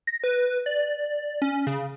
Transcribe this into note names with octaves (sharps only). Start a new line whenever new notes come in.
A#6
B4
D5
C#4
C#3